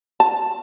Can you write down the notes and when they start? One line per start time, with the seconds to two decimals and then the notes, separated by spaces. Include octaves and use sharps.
0.20 A5